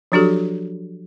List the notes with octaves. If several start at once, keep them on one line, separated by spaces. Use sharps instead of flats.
F3 F#3 D4 F#4 G4 A4